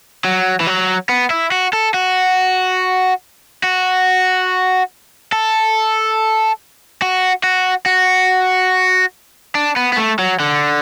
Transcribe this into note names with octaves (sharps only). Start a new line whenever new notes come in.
F#3
E3
F#3
B3
E4
F#4
A4
F#4
F#4
A4
F#4
F#4
F#4
D4
B3
B3
A3
F#3
D3